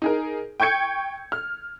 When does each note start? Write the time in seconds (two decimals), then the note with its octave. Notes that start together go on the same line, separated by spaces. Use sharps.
0.02 D#4 G#4 A#4
0.60 G5 C#6 G6 G#6 C#7
1.32 F6